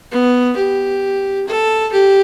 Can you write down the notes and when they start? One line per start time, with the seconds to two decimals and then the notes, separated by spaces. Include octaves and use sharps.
0.11 B3
0.57 G4
1.47 A4
1.92 G4